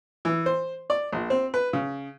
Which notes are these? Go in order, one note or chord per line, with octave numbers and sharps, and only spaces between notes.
E3
C5
D5
A#1
C4
B4
C#3